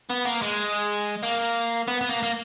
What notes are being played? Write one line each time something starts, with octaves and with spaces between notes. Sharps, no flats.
B3
A#3
G#3
A#3
B3
B3
A#3
A#3